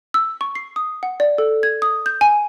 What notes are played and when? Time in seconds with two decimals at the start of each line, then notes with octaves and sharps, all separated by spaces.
0.14 E6
0.41 C#6
0.55 C7
0.76 D#6
1.03 F#5
1.20 D5
1.38 A4
1.63 G#6
1.82 D#6
2.06 G6
2.21 G#5